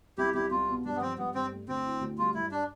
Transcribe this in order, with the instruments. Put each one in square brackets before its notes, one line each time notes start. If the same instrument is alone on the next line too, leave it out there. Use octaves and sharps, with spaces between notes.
[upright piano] C2 [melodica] E4 G4
[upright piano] C2 [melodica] E4 G4
[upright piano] C2 [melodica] F4
[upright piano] B2
[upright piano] G2 [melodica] D4
[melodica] B3
[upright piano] F3 [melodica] C4
[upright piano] G2 [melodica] B3
[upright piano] G2 [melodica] C4
[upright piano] A3
[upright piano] D2 [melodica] C4
[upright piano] E4
D2
[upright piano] G3 [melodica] F4
[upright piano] G2 [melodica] E4
[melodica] D4